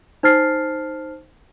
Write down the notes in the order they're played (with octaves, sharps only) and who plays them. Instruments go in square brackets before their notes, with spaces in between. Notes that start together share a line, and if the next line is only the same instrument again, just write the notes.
[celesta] D#4 C5 A5 F6 A6 C7